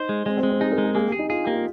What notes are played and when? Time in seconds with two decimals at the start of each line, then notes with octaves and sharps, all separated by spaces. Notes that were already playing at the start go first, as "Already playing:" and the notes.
Already playing: D#4 C5
0.09 G#3
0.26 G#3 C4
0.37 C4
0.43 G#3
0.49 C4
0.60 D#4 G#4
0.72 A#4
0.78 G#3
0.84 G#4
0.95 A#3 G#4
1.07 G4
1.12 G#4
1.19 D#4
1.29 F4 G#4
1.44 A#3 G4
1.54 F4